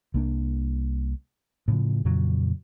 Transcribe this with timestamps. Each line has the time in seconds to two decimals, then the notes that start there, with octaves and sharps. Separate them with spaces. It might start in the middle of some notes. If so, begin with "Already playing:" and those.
0.14 C2 A#3 D4
1.68 A2 C#3 F3
2.05 F2 A#2 C#3 F#3